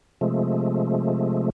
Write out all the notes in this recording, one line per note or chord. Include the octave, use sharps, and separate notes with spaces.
C3 F3 G#3 A3